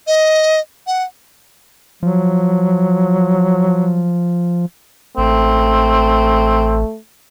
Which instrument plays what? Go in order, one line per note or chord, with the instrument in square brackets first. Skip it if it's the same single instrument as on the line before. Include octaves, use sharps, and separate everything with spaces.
[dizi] D#5
F#5
[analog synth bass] F3 [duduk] F#3
[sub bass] A1 [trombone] A3 [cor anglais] C4